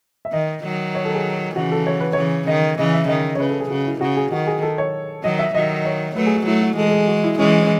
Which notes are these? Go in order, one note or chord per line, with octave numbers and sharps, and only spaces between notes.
E5
D#3 D#5
D#3 F#3
C#5
A4
G#4
C#3 E3 F#4
A4
C#5
B4
C#3 E3 C#5
D#3 D#5
C#3 E3 D#5
E5
D#3 D#5
C#5
C#3 B4
A4
G#4
C#3 F#4
E4
C#3 F#4
G#4
D#3 F#4
G#4
A4
C#5
D#3 F#3 D#5
E5
D#3 F#3 D#5
C#5
F#3 A3 B4
G#4
F#4
F#3 A3 E4
F#4
E3 G#3 A4
A4
G#4
F#4
E4
E3 G#3 C#4
C#4